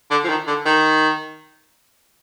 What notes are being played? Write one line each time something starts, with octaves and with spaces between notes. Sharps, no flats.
D3
F3
D#3
D3
D#3